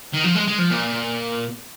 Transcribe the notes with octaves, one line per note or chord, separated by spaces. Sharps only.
D#3
F3
G#3
G#3
F3
A#2